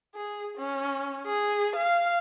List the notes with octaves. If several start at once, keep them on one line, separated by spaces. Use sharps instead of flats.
G#4
C#4
G#4
F5